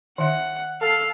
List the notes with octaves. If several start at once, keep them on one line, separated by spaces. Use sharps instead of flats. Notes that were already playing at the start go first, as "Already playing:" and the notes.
D#3 E5 F#5
A4 F5